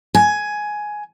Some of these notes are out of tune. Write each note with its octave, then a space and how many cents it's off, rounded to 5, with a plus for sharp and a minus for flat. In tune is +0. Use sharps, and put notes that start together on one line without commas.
G#5 +10